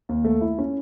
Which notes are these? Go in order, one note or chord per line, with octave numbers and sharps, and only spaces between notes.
D#2
A3
E4
C#4